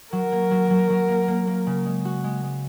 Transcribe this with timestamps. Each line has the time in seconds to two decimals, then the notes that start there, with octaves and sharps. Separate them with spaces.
0.12 F#3 A#4
0.32 A#3
0.51 F#3
0.70 F#3
0.90 F#3
1.09 A#3
1.28 A#3
1.47 A#3
1.67 C#3
1.86 G#3
2.05 F#4
2.24 G#3
2.43 G#3